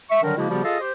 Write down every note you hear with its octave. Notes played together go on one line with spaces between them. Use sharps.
E5 C#6
D3 D#3 F#3 G3 D4 A#4
C#3 F3 G#3 A#3 E4 F#4
C#3 F3 G3 B3 F#4 G4
F4 G#4 A4 D#5 F5
G4 C5